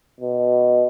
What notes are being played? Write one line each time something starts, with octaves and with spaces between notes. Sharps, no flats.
B2